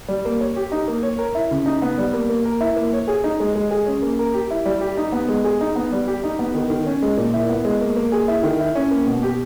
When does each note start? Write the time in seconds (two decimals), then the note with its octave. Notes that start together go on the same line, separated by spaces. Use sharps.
0.08 G3
0.25 A#3
0.40 C#5
0.56 G4
0.72 D#4
0.88 A#3
1.03 C#5
1.19 A#4
1.35 E4
1.51 C#3
1.66 D#4
1.82 B3
1.98 G3
2.14 A#3
2.29 A#3
2.45 A#4
2.61 E4
2.76 A#3
2.93 C#5
3.08 G#4
3.24 D#4
3.40 G#3
3.55 G#3
3.71 G#4
3.86 C#4
4.02 A#3
4.19 A#4
4.34 G4
4.51 E4
4.66 G3
4.81 G4
4.97 D#4
5.12 B3
5.29 G#3
5.44 G#4
5.61 D#4
5.76 B3
5.92 G3
6.07 G4
6.24 D#4
6.39 B3
6.54 D#3
6.70 D#3
6.86 C#4
7.02 G#3
7.17 A#2
7.34 E4
7.49 B3
7.65 G#3
7.81 A#3
7.97 A#3
8.12 G#4
8.28 E4
8.43 D#3
8.60 E4
8.75 C#4
8.91 A#3
9.06 B2
9.23 G4